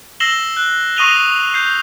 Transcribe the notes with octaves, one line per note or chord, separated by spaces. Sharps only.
E6 A#6 C7 E7 F#7 G7
F#6
C#6 D#6 A#6 D#7 F7 G7
G6 C7